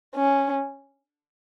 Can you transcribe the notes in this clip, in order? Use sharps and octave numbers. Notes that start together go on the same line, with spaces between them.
C#4